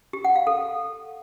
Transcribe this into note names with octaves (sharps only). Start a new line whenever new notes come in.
G4
F#5
F5
A4